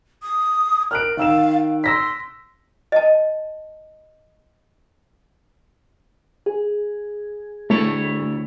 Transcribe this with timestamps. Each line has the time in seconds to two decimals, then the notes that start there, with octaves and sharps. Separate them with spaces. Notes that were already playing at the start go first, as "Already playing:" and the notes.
0.22 D#6
0.91 A#4 F6 F#6 D7
1.17 D#3 F5 E6 E7
1.84 C6 E6 A#6 B6
2.92 D#5 A5
6.46 G#4
7.70 D2 A3 E4 C#5